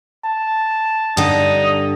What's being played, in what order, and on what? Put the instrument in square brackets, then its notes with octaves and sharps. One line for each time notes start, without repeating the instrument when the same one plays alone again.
[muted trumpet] A5
[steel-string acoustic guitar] G2 D3 [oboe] D#4